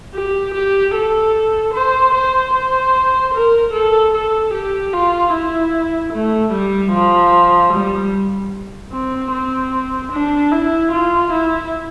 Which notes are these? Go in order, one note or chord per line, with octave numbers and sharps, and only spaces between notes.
G4
G4
A4
C5
C5
C5
A#4
A4
A4
G4
F4
E4
A3
G3
F3
G3
C4
C4
D4
E4
F4
E4